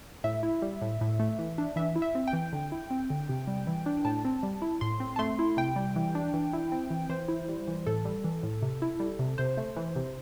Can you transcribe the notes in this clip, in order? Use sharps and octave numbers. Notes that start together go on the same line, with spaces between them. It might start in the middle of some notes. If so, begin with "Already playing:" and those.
A2 E5
E4
G3
A2
A2
A3
E3
D4
E3 E5
E4
E5
C4
G5
E3
D3
E4
C4
D3
C3
G3
E3
D4
A2 A5
C4
G3
E4
A2 C6
C4
A5
A3 C6
E4
C3 G5
G3
E3
D4
E3
E4
C4
E3
E3 C5
E4
G3
E3
A2 A4
G3
E3
A2
C3
E4
G3
C3
C3 C5
A3
E3
C3